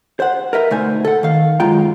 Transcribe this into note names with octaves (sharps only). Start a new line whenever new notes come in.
C5 F#5
A#4 B4 E5
D2 B2 A3 D#4 C5 G#5
A4 F#5
D#3 F5
F#2 B2 G#3 F4 G5 A#5